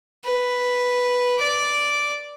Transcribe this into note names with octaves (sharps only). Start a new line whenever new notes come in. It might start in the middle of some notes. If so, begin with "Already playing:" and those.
B4
D5 D6